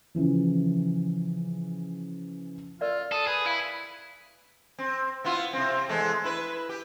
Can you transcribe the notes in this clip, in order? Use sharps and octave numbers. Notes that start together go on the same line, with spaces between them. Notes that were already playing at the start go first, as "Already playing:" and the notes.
C#3 E3 F3
F4 A#4 D5 F5
A4 D#6
G#4 B4
E4 F5 B5
C4
B3 E4 F4
C3 C4
E2 G#3 A3
E4 B4
G4